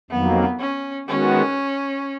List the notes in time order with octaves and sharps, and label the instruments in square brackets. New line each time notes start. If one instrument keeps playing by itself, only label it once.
[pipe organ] F2 D#3 F#3 A#3 [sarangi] B3
[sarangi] C#4
[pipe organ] D#3 G#3 B3 F#4 [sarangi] C#4